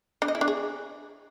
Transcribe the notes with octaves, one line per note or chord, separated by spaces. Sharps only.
D4
D#5
E4
D4
G#4